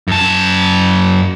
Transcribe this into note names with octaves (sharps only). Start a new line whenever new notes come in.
F#2 A5